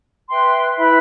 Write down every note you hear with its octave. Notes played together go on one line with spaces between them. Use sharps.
B4 E5 G5 C6
E4 B4 E5 B5